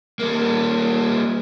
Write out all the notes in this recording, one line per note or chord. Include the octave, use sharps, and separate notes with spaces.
G3 A#3